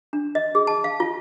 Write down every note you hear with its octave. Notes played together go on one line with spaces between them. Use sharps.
D4
D#5
G#4
A5
F5
F4